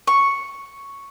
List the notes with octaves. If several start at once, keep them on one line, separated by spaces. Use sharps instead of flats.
C#6